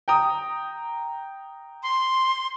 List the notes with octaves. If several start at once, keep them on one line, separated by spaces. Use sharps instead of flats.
G5 A#5 D#6
C6